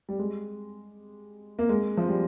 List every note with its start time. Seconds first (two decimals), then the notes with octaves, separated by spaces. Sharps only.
0.09 G3
0.19 G#3
1.59 A#3
1.69 G#3
1.97 F3
2.08 G3